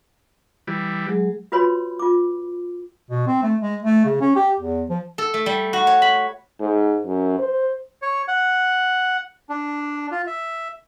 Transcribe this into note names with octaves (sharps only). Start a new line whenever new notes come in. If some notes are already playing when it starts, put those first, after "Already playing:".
E3 G3
F#3 G#3 G#4
F4 F#4 B4 C#5 B5 C6
F4 D6
B2
C4
A3
G#3
A3
C#3
C#4
G4
E2
F3
A4
A3
G3
F#4
C#5
B5
G#2
F#2
C5
C#5
F#5
D4
F4
E5